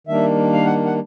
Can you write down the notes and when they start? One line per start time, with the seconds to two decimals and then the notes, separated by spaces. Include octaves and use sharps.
0.07 D#3 G3 A#3 D4 E5
0.54 F5
0.66 F#5
0.85 F#5